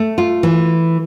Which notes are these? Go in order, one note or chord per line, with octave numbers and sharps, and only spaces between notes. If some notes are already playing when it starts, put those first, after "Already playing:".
Already playing: A3
F4
E3